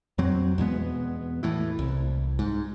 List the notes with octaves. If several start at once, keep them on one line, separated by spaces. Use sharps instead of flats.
F2 F#3 C4
E2 B2 G#3 B3
A2 E3
C2
G#2